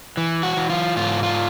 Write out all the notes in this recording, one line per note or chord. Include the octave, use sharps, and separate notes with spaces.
E3
F#4
E3
F4
G#2 F4
F4